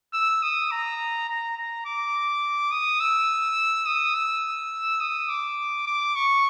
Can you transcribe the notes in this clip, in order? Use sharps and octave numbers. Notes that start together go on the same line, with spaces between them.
E6
D#6
A#5
A#5
A#5
D6
D#6
E6
D#6
E6
D#6
D6
D6
C#6